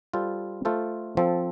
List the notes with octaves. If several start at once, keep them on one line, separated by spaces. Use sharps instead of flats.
G3 F4 A4 C5
A3 F4 A4 C5
F3 C4 A4